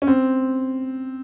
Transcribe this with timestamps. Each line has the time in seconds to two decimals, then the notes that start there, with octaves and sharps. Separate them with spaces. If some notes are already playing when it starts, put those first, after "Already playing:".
0.02 C#4
0.07 C4